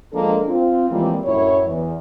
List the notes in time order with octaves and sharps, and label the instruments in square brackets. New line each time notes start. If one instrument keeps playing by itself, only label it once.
[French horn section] F3 G#3 A#3 D4 A4
C4 F4
E3 F3 G3 G#3 A#3 C4
F#2 A2 E4 C#5
E2